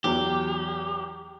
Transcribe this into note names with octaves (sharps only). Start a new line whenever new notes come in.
E2 F#3 G4